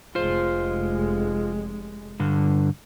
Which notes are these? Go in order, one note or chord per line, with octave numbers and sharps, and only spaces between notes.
F1 G#3 F4 C5
G2 D3